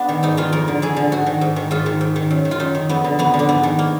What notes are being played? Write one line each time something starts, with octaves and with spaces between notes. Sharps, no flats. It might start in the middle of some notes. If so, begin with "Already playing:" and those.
Already playing: B3 D4
D#3
G#2 D#4
D#3 F4
F2 A#4
D3
F2 G#4
D3
G#2 F#4
D#3
G#2
D#3
G#2 F4
D#3
G#2
D#3
F#2
D#3
F4
F#2 D#4
D#3
F2 B3
D3
F2 B3
D3
D4
G#2 B3
D#3
A#3